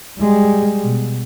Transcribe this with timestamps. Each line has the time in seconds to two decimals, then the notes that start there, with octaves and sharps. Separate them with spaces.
0.20 G3 G#3
0.83 B2